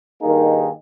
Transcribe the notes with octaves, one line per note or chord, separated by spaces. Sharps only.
G2 D#3 A#3 D#4 G#4